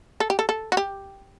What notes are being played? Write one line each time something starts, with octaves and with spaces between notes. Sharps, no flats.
A4
G4
A4
A4
F#4
G4